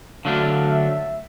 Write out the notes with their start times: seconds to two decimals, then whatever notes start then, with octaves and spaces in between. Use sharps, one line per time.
0.25 D3 F#3 A3 D4 F5
0.69 E5